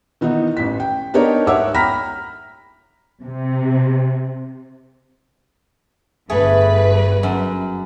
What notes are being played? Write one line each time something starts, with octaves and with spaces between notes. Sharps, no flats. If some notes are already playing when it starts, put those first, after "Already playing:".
D#3 E3 B3 D#4
A1 B6
G5
B3 D4 D#4 G4 A#4 C#5
G#2 C#5 E5 F#5 D6 E6
G5 A#5 B5 F6 A#6 B6
C3
G1 G2 A3 G#4 B4
F#2